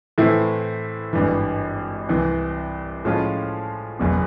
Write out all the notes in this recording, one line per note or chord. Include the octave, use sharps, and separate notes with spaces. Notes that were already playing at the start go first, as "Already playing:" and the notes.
A2 E3 A3 C4 E4
G#1 G2 E3
C2 C3 E3
A2 F3 G#3 C#4 F4
F#1 E2 B2